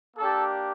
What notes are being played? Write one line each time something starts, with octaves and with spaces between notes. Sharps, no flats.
A#3 D4 G4 A4